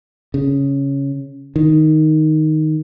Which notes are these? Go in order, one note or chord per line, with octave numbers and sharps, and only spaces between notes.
C#3
D#3